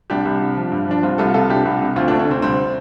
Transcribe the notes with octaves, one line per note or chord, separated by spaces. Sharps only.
C2 D4 G4
C2
C3
F3
G2
F3 D4
C2 C4 F4
C2 F4 A4
C3 F4 A4
C2 D4 G4
C2
C3
D2 C4 F4
A3 D4
D2
A3 D4
C3 C4
C2 C4